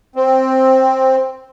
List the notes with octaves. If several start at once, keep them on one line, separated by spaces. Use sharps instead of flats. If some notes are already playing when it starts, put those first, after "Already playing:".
C4